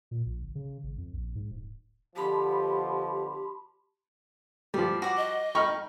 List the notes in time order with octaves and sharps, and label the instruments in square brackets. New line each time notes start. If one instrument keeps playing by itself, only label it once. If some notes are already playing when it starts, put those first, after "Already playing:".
[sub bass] A#2
A#1
G1
C#3
G#1
F2
A#1
G#2
D1
[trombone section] B2 D3 F3 [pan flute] G4 [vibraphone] A5 B5 C6
[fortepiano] F3 G3 [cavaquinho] D5
[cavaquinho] F#4 D5 F#5
[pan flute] D#5
[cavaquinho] D#4 G5 B5 [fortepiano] C#6 F6